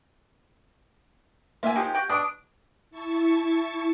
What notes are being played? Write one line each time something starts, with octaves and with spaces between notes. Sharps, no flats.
A#3 F4 E5 G#5
D#3 F3 G#3 G4
F#4 G5
B2 D4 D#6 D7
E4 A5 C#6